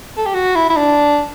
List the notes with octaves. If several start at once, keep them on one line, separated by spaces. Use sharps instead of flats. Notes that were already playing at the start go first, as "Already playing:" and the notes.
A4
G4
F#4
E4
E4
D4